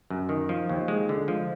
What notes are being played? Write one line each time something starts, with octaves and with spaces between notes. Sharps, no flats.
F#2
D#3
F3
D#2
G#3
D3
F3